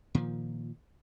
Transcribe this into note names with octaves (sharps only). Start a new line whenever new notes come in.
A#2 D#3 F3